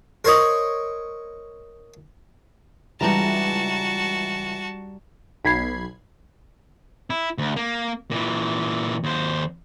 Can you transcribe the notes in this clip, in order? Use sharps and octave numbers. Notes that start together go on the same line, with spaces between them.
A#4 C5 C#5 D#5
C#2 E3 G3 D4 F#4 A5 A#5
B1 B5 G#6 C7
E4
D2
A#3
A#2 E3
D#2 C5